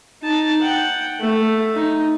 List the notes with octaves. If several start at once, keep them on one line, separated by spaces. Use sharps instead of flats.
D#4 A5
F#5 G5
A3
D#4